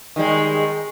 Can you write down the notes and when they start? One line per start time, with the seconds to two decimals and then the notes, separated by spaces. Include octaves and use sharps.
0.16 D#3 G3 G#3